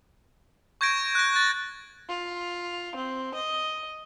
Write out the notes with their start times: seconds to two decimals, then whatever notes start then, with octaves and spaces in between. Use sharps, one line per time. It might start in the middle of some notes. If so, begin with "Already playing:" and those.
0.81 C#6 G6 G#6 A#6 D7
1.15 F#6 A#6
1.36 A6
2.08 F4
2.94 C4
3.34 D#5